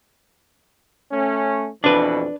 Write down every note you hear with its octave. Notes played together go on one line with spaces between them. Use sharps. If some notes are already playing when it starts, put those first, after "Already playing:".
A3 C#4
F2 B2 E3 D4 B4